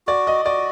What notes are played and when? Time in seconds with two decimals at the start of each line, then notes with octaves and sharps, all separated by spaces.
0.07 F#4 D5
0.27 D#5
0.45 F#4 D5